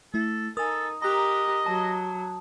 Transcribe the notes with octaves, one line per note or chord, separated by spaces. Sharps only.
A3 E4 A4
D#4 A4 A#4 G#5 D#6
G4 A#4 D#5 A#5 F#6
F#3 A5